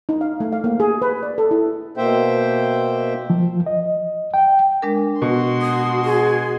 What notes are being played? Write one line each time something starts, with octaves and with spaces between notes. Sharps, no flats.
D#4
F5
A3
F5
A#3
G#4
B4
D5
A4
E4
B2 A#3 C5 E5 G5
F3
D#5
G5
G#3 D4 A#4
B2 F#4 C6
D#6
G#4